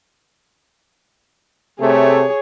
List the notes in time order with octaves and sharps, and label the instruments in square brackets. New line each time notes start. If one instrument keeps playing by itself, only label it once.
[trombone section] C3 A3 [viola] G#4 C#5